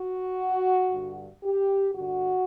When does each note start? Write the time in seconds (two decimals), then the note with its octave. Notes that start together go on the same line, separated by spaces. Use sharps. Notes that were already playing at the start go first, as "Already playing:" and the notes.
Already playing: F#4
0.92 G2 D3
1.44 G4
1.95 G2 D3 F#4